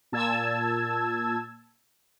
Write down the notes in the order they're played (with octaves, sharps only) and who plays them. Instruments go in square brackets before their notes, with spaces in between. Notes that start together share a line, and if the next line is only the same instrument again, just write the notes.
[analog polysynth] A#2 A5 E6 G#6